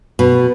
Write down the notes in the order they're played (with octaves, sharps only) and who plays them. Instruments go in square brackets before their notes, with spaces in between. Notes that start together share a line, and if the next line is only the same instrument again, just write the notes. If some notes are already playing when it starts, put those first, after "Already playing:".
[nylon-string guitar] B2